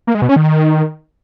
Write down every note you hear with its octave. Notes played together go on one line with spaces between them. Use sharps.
A#3
G#3
B2
C#4
D#3